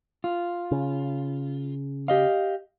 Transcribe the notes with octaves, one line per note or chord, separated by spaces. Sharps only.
F4
C#3
G4 D#5 F5